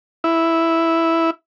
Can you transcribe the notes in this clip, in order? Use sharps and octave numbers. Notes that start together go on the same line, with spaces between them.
E4